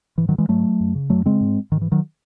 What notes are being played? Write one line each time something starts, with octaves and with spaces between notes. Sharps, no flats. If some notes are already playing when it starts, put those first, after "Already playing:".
G#2 E3
D#3 F#3
E3 G#3
G#2 F#3 A3
F#2
C#3
F#2 F#3 A3
C#3 G#3 C4
G#2
G#2 D#3
E3
D#3 F#3